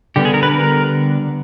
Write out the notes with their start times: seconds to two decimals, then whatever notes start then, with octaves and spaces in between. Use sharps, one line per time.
0.16 D3 G3 B3 G4
0.25 G#4
0.34 A#4
0.43 B4
0.51 A#4